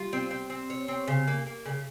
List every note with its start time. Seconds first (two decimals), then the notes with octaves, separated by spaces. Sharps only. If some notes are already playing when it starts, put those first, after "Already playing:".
Already playing: G3 F4
0.13 C4
0.31 C4
0.50 C4
0.70 C#5
0.88 C4
1.08 C#3
1.27 A#3
1.47 A#3
1.65 C#3